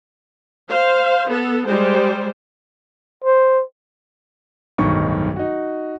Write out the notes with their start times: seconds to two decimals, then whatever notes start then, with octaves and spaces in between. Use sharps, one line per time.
0.69 C5 F5
1.30 B3 A4
1.65 G3 G#3 C5
3.24 C5
4.78 D1 B1 G2 D#3 C#6
5.36 D#4 F#4